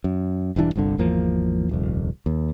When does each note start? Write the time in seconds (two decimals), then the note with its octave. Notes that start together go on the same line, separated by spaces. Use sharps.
0.04 F#2
0.56 E1 G2 E3 D4
0.76 G1 C2 G2 D3
0.98 G#1 E2 F3 A#3
1.69 D#1 C2 F2
2.26 D#2